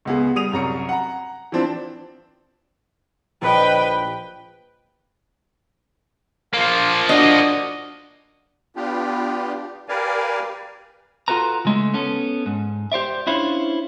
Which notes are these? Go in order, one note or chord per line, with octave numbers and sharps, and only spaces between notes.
C#2 B3 G#4
G3 G#4 D#6 D#7 F7
C2 F#2 A#5 C#7
F#5 A#5
E3 F3 C4 D4
A#1 B4 D#5 G5
F3 A#3 F5
D4 F#4 D#5 A#5
B3 D4 F4 G4
G4 A#4 B4 D5 F5 G#5
F4 F#4 A4 B4 A#5
C#3 G#3 A3
B3 C#4 A4
G#2
G4 C5 D5 E5
C#4 D4 E4 F4 C5 C#5